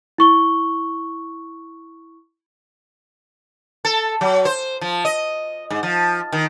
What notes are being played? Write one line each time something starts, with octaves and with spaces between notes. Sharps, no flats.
E4 C#6 G7
A4
F#3
C5
F3
D#5
G#2
F3
D#3